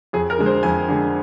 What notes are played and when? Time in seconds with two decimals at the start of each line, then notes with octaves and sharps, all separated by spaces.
0.13 F2 G#4
0.30 A#4
0.38 D3 G#3
0.46 C5
0.63 F2 G#5
0.88 D3 G#3